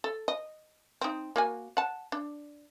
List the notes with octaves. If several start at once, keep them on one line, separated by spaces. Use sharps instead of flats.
A4
D#5
C4 D#4
A#3 F#4 G#5
F#5 A5
D4